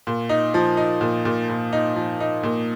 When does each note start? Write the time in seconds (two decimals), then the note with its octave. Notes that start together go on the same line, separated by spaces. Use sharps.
0.07 A#2
0.29 D#4
0.54 F3
0.77 D#4
1.01 A#2
1.25 A#2
1.49 A#2
1.73 D#4
1.96 F3
2.20 D#4
2.43 A#2